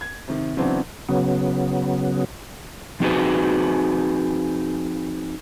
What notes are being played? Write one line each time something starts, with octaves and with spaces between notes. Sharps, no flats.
G#6
C3 D#3
C#3 E3 F#3 B3 C4 D4
C#3 F#3 B3
F3 C4 D#4 F#4 G#4 B4